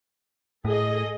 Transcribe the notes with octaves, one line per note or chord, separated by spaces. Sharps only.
A2 G#4 A4 D#5